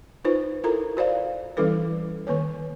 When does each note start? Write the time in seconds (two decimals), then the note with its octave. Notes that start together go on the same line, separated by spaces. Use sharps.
0.25 D#4 F4 B4 C5
0.64 E4 F4 A4 A#4 A#5
0.97 F#4 C5 D5 F5
1.57 E3 G3 C#4 E4 A4 B4
2.27 D#3 A#3 B4 C#5